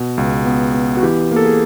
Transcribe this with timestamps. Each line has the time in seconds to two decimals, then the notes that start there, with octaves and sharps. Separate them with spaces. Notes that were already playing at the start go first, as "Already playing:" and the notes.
Already playing: B2
0.18 C#2
0.46 B3
0.74 B3
0.97 F#4
1.03 E3 G4
1.31 A#3
1.36 A4
1.45 G#4